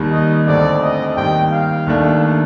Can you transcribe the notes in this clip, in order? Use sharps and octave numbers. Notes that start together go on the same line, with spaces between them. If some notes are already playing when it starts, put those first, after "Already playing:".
Already playing: D#2 D#3 G3
D#5
D2 D3 A3 C4 D5
D#5
D#2 D#3 G3 G5
F5
D#2 D#3 A3 D4